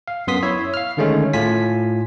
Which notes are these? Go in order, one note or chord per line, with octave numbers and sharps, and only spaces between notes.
F5
F#2 B3 C6 D#6 B6
E4 C#5 E5
F5 F6
D3 D#3 G#3 A3 C#4
A2 F4 G#5 B6